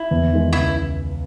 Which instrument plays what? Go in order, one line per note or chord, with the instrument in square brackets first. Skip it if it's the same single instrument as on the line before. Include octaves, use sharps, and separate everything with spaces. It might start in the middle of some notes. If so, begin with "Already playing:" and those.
Already playing: [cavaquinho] E4
[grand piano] E2
D#3 G#3
[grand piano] C#2 [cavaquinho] E4